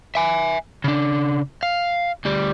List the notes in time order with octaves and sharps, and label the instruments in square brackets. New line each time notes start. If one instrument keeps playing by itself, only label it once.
[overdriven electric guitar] E5 G#5
C#3 D4
F5
D2 G3